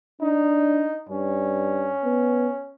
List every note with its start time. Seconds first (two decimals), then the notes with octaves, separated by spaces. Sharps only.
0.21 D4 D#4
1.09 G2 C#4
2.05 B3